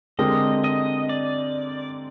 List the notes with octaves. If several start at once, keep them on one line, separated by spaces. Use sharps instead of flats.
D3 G#3 C4 G4 A#4 D#5
D#5
D5